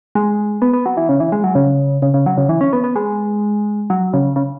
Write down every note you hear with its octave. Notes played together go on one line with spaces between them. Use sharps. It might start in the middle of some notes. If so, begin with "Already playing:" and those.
G#3
B3
B3
F#3
E3
C#3
E3
G#3
F#3
C#3
C#3
C#3
F#3
C#3
E3
C#4
B3
B3
G#3
F#3
C#3
C#3